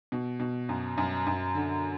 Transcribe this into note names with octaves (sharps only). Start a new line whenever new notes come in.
B2
B2
F#2
F#2
F#2
D3